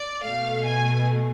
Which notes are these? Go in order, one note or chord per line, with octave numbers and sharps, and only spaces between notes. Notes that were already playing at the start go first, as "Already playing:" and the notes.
Already playing: D5
B2 A3 F5
G#5